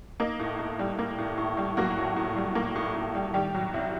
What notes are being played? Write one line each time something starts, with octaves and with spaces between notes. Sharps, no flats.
A#3 D#4
A2
A2
G3
A#3
A2
A2
G3
F#3 A#3 F#4
A2
A2
G3
A#3
A2
A2
G3
D#3 G3 G4
F#3
C2